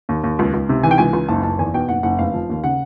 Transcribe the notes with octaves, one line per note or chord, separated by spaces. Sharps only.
D#2
D#2
C#2
C#2
C3
E3 G#5
G5
C#2 G#5
C#2
F#1 A5
F#1 A5
E2 G#5
B2 G5
F#1 F#5
F#1 F#5
F1 F5
F3
D#2
C#3 F#5